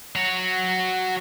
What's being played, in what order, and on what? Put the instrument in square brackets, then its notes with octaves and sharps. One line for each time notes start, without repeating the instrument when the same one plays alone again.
[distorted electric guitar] F#4 C#5